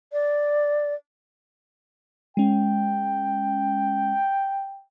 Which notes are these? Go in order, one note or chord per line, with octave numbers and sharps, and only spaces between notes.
D5
G#3 C#4 G5